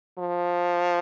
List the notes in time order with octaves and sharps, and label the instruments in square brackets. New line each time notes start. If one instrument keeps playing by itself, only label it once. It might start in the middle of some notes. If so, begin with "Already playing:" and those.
[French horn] F3